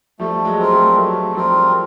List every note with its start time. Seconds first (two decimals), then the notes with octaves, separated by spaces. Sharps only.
0.19 F3 G3 A3
0.45 F#3 G#3
0.58 C4 F4 A#4
0.71 G3 A3
0.96 F#3 G#3 A3
1.34 F3 G3 C4 F4 A#4